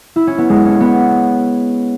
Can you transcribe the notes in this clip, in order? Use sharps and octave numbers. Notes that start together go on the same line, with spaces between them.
E4
C#4
B3
G#3
C#4
B3